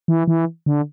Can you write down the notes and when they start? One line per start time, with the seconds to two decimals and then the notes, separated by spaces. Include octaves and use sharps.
0.08 E3
0.27 E3
0.66 D3